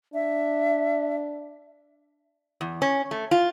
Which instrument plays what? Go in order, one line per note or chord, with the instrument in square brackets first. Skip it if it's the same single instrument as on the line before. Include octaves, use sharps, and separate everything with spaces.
[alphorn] D4 [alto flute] E5
[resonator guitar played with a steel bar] E2
C#4
A3
F4